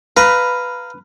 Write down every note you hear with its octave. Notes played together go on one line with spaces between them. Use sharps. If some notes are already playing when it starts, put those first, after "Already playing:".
B4 F5 A#5 B5